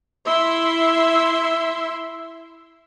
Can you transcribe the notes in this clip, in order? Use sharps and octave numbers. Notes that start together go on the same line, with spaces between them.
E4 E5 C6